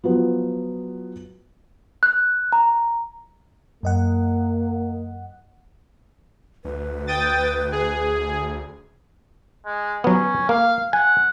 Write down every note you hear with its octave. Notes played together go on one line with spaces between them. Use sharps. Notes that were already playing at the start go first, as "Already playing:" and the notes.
F3 F#3 B3
F#6
A#5
F#2 A#3 D#5 F#5
D2 B4
G5 D#6 A6
G#4
G#3
F#3 B3 C#4
A#3 F5
F#5 G#5